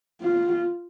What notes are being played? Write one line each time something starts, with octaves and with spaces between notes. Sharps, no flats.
F4